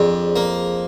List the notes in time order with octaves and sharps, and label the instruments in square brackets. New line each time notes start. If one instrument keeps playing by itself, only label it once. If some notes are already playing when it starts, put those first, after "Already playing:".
Already playing: [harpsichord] F2 D4 [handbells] G#4
[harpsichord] A#3